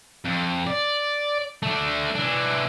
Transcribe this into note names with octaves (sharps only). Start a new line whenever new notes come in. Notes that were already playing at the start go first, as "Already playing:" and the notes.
F2
D5
A3 D4
E3 D4